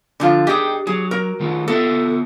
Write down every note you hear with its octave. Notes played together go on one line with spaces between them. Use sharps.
D3 F3 F4
G4 G#4 D#5 G5
F#3 G#4
A#4
D#3 A3 F4
B3 F4 A4 E5